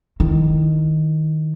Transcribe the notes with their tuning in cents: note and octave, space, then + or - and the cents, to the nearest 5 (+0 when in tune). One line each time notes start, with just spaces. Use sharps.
D#3 +0 E4 +0